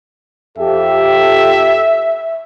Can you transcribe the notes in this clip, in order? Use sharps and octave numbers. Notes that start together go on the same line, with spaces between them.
F2 G4 A4 E5